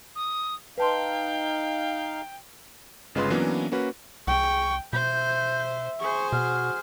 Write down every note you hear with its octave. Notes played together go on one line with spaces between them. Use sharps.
D#6
D#4 B4 F5 G5 A5 C6
G1 C#3 G#3 F4 B4 C6
E3 F#3 A#3 B3 C#4 D4
A#3 C#4 F#4 B4
C2 G#4 G5 C#6
B2 C5 E5 G6
G#4 C5 C#6
B2 F#4 F6